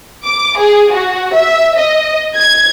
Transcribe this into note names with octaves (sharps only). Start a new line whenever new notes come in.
D6
G#4
F#4
E5
D#5
G#6